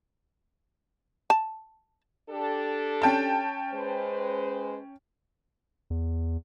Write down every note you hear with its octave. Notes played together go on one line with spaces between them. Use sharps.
A5
D4 G4 A4
C#4 G5 A5
G#3 B4 C5
E2